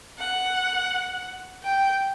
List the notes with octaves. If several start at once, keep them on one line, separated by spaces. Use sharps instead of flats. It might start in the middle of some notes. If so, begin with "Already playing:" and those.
F#5
G5